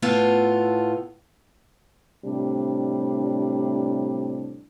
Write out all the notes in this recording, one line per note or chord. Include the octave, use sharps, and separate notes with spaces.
A2 B3 F4 A4
A2 C3 G3 D4